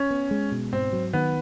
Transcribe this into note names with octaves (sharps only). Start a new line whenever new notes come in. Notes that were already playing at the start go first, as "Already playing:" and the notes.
Already playing: C#4
B3
G#3
B2
G#2 C4
F#3
D#3 B3